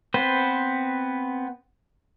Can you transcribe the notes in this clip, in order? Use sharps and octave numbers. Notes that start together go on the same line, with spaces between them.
B3 C4 B4 C5